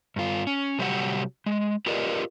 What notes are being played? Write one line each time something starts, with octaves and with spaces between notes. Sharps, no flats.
G2 F4
C#4
C3 F#3 G3 G4 C#5 F#5
G#3
F4 G4 A#4 B4 D5 D#5